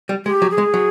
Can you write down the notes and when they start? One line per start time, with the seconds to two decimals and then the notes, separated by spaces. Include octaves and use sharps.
0.09 G3
0.26 G#3 G4
0.42 F#3
0.50 G#4
0.58 G#3
0.74 F#3